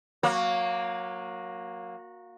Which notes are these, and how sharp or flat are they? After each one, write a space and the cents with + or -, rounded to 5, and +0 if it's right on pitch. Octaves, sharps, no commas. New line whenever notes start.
F#3 -20 A#3 +0